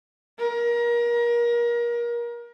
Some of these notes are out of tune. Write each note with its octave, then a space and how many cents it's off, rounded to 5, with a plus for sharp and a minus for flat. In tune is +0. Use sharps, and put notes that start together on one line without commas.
A#4 +30